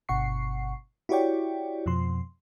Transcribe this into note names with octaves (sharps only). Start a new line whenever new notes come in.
G1 B2 F#5 C#6 C7
E4 F#4 G4 C#5 D5 G5
F2 B2 F3 C6